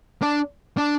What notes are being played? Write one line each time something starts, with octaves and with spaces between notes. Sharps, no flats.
D4
D4